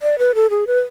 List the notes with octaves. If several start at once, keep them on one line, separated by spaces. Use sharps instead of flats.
D5
B4
A4
G#4
B4